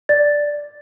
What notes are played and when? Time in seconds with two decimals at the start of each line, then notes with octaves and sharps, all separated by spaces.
0.09 D5 A6